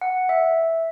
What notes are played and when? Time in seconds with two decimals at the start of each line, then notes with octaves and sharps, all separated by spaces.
0.01 F#5
0.29 E5